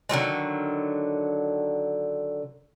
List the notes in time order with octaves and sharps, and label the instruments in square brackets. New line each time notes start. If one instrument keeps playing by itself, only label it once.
[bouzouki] D3 D#3 F#3 G#3